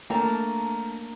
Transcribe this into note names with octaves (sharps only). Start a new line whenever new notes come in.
A3 A#3 D4 A5 A#5